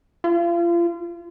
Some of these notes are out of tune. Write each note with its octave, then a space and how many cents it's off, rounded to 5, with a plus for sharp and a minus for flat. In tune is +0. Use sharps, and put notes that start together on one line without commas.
F4 -35